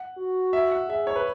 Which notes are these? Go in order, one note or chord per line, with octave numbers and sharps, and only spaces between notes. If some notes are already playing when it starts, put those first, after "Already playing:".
Already playing: F#5
F#4
E5
F#5
G#4 E5
C#5
B4